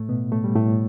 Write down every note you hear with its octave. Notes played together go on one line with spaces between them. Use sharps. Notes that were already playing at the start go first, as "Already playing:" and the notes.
Already playing: A2 A3
B2 B3
A2 A3
G3
A2 A3